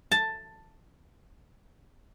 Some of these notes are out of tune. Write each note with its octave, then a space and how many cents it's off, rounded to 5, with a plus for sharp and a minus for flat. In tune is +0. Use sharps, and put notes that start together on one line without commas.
A5 +10